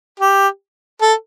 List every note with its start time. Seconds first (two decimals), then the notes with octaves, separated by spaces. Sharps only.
0.20 G4
1.02 A4